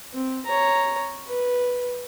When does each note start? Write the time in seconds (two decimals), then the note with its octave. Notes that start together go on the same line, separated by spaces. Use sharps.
0.14 C4
0.46 C#5 A#5
1.27 B4